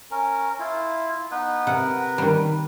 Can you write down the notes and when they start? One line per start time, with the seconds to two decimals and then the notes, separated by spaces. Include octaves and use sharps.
0.11 C#4 A#4
0.59 E4 F4
1.31 B3 D#4 B4
1.67 C3 A#4 B4 F#5
2.18 D#3 G3